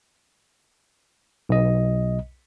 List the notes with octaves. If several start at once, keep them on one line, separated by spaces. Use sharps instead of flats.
B1 D#5